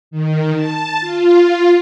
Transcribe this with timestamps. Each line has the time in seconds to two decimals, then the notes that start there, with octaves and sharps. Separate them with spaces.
0.11 D#3
0.54 A5
1.00 F4